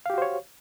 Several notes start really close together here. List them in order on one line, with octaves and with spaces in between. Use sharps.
F5 G4 F#4 C5 C#5